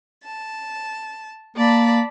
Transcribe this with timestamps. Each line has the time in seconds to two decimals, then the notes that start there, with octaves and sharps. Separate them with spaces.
0.24 A5
1.57 A#3 D5 A5 B5